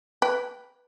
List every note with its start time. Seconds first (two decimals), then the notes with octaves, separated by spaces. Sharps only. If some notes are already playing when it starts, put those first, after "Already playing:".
0.22 B4 G5